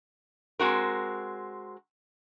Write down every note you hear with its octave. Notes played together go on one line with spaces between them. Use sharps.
G#3 C4 F#4 A#4